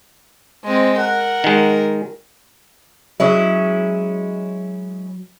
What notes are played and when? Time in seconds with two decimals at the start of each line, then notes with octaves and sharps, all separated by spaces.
0.64 G#3 C4
0.98 A#4 F#5
1.44 D#3 G#3
3.20 F#3 G#3 C#4 E4